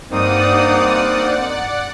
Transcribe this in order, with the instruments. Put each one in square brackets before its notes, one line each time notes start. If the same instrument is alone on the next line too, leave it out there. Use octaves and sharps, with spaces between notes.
[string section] G2 D#6 [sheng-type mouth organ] A#3 C4 D#4 [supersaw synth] D5 F#5